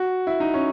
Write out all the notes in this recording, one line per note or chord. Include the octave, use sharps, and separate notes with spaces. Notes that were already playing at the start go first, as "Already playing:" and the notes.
Already playing: F#4
E4
D#4
C#4